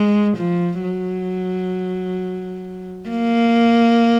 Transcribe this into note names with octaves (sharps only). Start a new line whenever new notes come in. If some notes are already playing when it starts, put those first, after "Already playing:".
Already playing: G#3
F3
F#3
A#3